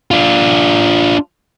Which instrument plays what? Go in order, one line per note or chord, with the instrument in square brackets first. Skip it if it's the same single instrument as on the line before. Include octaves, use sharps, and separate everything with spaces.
[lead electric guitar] D4 F4